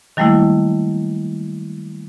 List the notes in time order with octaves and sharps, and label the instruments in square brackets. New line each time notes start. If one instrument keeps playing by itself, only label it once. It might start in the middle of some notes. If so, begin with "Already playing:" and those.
[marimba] D#3 F#3 G3 A3 A#3 E4